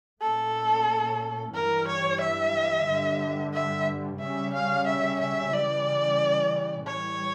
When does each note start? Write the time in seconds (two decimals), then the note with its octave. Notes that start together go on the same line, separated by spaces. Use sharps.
0.21 A#2 A3 C#4 A4
1.54 G2 E3 G3 A#4
1.87 C#5
2.21 E5
2.88 G2 D3 G3
3.53 E5
4.20 C#3 G3 C#4 E5
4.54 F5
4.86 E5
5.20 E5
5.53 C#3 E3 G3 C#4 D5
6.86 A2 E3 G3 C#5